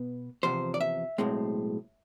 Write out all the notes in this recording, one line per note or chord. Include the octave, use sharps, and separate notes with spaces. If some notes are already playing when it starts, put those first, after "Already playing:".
Already playing: B2 B3
E2 C3 F3 C5
D5
E5
B1 A2 G#3 C4